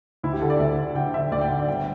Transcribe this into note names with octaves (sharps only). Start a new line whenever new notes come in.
D2 E4
G4
D3 A4
D5
D2 E5
D3
D3 G5
D3 E5
D2 D5
G5
D3
D5
G1 G5